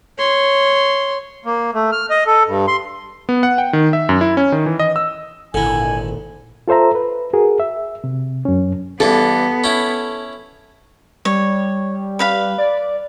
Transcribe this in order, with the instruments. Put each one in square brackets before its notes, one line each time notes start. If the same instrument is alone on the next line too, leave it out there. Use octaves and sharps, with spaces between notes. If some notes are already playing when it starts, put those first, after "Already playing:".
[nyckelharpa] C#5 C6
[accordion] A#3
A3
F6
D#5
A4
G2
C6
[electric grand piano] B3
F#5
G5
D#3
E5
F#2
E4
C#4
D#3
E3
D#5
E6
[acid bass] G#1 [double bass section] A#2 D#3 [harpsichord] D3 E4 [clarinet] G#5
[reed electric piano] F4 A4 C5 E5 A#5
B4
F#4 G#4 A#4
E5
C3
F#2 C#4
[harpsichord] G2 E3 [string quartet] B3 [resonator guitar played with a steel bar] A4
[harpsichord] C#4 E4
[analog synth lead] G3 [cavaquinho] C#5
[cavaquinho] B4 F5 B5
[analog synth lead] D5